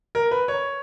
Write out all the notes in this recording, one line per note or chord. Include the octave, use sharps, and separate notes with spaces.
A#4
B4
C#5